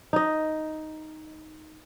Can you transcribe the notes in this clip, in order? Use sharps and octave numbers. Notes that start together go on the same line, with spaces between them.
D#4 D#5